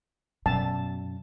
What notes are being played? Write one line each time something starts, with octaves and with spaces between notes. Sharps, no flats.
F#2 B2 A5